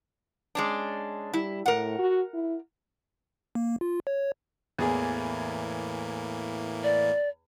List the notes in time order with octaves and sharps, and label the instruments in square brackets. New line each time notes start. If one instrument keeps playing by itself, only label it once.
[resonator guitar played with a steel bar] G#3 C#4 D4
[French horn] G3 [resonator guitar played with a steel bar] E4
[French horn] A2 [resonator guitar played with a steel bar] A#4 F#5
[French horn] F#4
E4
[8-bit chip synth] A#3
F4
C#5
[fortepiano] E2 G#4 [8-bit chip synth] A2 E3 A#3
[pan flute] D5